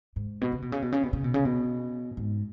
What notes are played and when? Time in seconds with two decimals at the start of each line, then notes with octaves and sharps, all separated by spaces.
0.16 G#2
0.41 B2
0.52 C#3
0.62 B2
0.72 C#3
0.82 B2
0.92 C#3
1.03 B2
1.13 C#3
1.24 B2
1.34 C#3
1.45 B2
2.17 G#2